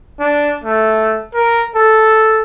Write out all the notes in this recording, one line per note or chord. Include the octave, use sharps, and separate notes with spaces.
D4
A3
A#4
A4